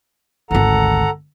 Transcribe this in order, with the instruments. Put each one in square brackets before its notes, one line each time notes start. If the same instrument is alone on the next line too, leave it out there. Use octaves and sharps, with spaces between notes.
[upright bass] G#1 D2 [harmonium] A4 F#5 A#5